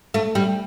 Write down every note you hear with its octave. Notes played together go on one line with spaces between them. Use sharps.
A3
G3